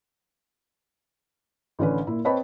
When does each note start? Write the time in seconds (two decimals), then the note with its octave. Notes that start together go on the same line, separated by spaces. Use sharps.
1.79 A1 D3 C#4 B4
2.07 A#2 E4
2.25 C4 B4 C#5 D#5 A5 B5